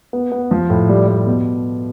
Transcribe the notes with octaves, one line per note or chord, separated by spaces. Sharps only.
B3
B3
F3
A2
G3
G3
B2